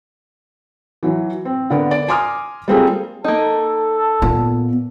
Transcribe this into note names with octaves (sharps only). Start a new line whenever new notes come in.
E3 F#3
C4
D3 B3 A#4 D5
D5
G#5 A#5 C6 D6 D#6 F6
G3 A#3 C4 F4 G#4 A4
A#3 D#4 A4
A#2 B3